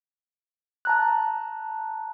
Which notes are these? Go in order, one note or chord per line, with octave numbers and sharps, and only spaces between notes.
A5 A#5 F#6